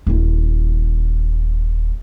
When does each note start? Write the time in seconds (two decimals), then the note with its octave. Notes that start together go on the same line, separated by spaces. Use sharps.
0.07 D#1 E4